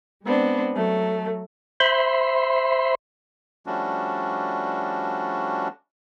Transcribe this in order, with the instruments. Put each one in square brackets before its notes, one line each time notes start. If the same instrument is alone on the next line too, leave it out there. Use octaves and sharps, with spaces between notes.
[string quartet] G#3 B3 C4 D4
F#3 A3
[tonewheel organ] C5 E5 B5 C6
[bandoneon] F3 G3 A3 C#4 D4 F#4